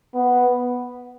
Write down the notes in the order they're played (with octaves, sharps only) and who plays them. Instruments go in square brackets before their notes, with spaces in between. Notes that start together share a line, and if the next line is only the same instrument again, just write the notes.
[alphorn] B3